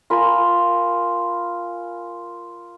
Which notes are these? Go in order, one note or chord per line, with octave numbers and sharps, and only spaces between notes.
F4 A#4 G#5 B5